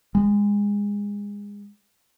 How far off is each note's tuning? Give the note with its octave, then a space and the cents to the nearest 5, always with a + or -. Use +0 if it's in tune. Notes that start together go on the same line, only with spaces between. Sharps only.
G#3 -25